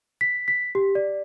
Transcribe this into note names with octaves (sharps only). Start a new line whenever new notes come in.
B6
B6
G4
D5